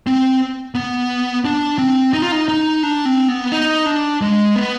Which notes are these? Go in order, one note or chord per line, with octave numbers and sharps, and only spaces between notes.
C4
B3
D4
C4
D#4
F4
D#4
D#4
D4
C4
B3
D#4
D4
G#3
B3